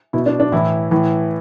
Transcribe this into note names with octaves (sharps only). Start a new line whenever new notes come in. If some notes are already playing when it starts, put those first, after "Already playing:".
B2 E4
D4
D4
A2 E3 E4
A2 E3